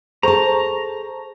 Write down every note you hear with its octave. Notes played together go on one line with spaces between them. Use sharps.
G#4 A4 C5 A5 A#5 C#6